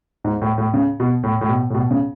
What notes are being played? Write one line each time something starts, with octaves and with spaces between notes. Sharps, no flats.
G#2
A2
A2
C#3
B2
A2
A2
B2
A2
B2
C#3